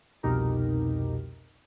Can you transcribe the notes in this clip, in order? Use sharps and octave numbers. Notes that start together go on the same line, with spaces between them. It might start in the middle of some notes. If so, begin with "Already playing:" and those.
C2 F2 B2 D#4 G4 A#4